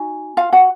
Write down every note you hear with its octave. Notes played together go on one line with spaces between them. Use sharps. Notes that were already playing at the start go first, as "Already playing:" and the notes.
Already playing: D#4 F#4 G#5
F4 F5
F#4 F#5